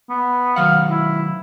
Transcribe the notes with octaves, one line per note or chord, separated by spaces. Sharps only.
B3
D#3 F#3 F5 F#5
E4